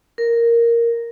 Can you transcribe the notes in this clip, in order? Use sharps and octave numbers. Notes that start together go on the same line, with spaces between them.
A#4